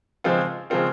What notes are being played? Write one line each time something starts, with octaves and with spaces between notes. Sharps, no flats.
C#3 F3 G#3 C4 F4
C#3 F3 G#3 C4 F4